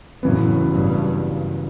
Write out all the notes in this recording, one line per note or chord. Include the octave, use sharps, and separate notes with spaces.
F#1 F#2 A2 E3 B3
G2